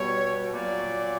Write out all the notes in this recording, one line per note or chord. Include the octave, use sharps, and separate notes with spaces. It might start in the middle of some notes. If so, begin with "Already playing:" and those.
Already playing: B2 G3 C#5
A#2 F#3 D5